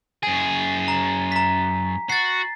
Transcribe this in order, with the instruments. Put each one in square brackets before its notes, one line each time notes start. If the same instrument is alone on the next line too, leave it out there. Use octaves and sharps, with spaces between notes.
[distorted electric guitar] F#2 G#4 [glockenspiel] G#5
[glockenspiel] A#5
A#5 B6
[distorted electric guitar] F#4 [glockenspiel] A6 C7